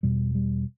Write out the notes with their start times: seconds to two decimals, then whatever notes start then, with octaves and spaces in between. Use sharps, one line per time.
0.03 E2 B2 G3
0.35 G3